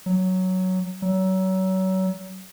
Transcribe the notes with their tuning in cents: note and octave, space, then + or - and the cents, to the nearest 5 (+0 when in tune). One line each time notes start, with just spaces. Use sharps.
F#3 +5
F#3 +30